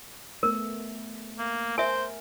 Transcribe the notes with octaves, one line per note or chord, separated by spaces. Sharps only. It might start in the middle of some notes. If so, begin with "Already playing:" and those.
A3 B3 A#4
A#3
A#4 C5 E5 G#5